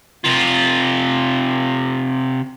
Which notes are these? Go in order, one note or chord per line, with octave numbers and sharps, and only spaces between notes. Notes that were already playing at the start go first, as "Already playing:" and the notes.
C3 F4